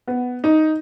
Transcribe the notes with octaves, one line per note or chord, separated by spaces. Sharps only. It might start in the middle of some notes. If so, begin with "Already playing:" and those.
B3
D#4